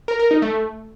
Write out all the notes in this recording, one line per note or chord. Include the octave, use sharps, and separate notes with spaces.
A#4
A#4
D#4
A3